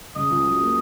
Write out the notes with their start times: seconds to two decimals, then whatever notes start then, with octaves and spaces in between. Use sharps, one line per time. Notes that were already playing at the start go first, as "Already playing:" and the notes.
0.16 C#3 D#5
0.30 C#2
0.45 F#3
0.60 A#3